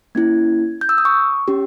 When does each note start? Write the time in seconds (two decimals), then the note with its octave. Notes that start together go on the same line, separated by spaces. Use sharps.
0.15 A#3 C#4 E4 G#6
0.81 G6
0.89 E6
0.98 D#6
1.05 C#6
1.48 C#4 G4